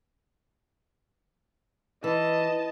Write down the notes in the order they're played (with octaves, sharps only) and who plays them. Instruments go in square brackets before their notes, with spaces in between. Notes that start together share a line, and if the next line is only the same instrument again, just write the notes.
[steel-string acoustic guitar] E3 [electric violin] D#5 A5